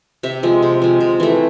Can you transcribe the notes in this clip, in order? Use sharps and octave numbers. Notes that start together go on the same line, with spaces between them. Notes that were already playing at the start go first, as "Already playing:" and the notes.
C3 E5
F3 G#3
C3
F3 G#3
C3
E3 A3